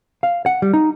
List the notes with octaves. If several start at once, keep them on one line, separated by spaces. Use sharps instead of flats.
F5
F#5
G3
D#4